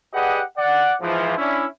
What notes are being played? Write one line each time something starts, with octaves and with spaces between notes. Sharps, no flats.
G4 G#4 B4 D5 D#5 F#5
D5 F#5
G#2 E3 F3
C#4 D4 E4